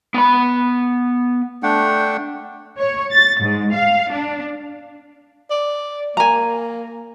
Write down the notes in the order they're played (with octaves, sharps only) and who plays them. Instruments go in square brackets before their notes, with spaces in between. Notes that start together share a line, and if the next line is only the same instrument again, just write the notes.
[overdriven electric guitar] B3 B5
[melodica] A3 D4 F#5 G5
[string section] C#5
A6
G#2
F5
D4
[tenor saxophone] D5
[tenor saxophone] A#3 [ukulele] G#5 A#5